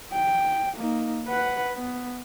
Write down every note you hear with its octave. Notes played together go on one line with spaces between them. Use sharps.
G5
A#3 D#4
B4 F#5
B3